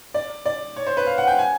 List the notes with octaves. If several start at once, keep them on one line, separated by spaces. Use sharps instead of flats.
D5
D5
C#5
C5
B4
F5
F#5
G5
G#5